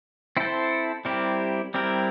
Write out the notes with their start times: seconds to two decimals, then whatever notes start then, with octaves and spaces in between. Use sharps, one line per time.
0.37 C4 E4 A4 C5
1.05 G3 C4 E4 G4 A#4
1.74 G3 C4 E4 G4 A#4